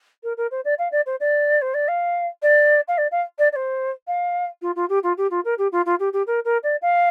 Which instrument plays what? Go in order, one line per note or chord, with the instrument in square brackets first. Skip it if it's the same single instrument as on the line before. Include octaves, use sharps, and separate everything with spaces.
[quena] A#4
A#4
C5
D5
F5
D5
C5
D5
C5
D5
F5
D5
F5
D5
F5
D5
D5
C5
F5
F4
F4
G4
F4
G4
F4
A#4
G4
F4
F4
G4
G4
A#4
A#4
D5
F5